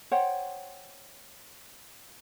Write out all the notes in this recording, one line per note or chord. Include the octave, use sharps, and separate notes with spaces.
C5 C#5 F#5 G5